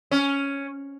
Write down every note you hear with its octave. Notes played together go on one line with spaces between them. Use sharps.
C#4